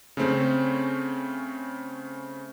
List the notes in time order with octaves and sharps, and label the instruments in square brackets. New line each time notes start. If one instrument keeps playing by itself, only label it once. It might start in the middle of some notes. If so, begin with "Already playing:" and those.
[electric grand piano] C#3 A3 C4 C#4